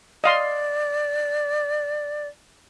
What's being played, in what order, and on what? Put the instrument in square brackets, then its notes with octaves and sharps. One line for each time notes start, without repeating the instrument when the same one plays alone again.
[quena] D5 [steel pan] D#5 F5 C6